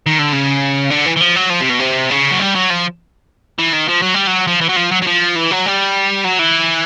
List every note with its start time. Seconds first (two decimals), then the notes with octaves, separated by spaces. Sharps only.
0.06 D#3
0.19 D3
0.33 C#3
0.91 D3
1.06 E3
1.17 E3
1.21 F3
1.36 F#3
1.50 F3
1.61 C3
1.70 B2
1.80 C3
2.11 C#3
2.31 F#3
2.39 G3
2.55 F#3
2.70 F3
3.59 E3
3.73 D#3
3.88 F3
4.02 F#3
4.14 G3
4.27 F#3
4.47 F3
4.61 E3
4.69 F#3
4.76 F3
4.91 F#3
5.02 F#3
5.07 F3
5.36 E3
5.51 F#3
5.66 G3
6.24 F#3
6.39 E3